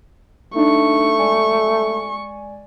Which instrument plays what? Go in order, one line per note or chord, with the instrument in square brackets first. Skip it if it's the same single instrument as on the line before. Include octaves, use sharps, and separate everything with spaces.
[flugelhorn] A3 [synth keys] D4 D#4 [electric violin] C#6
[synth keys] G#3 D5 G#5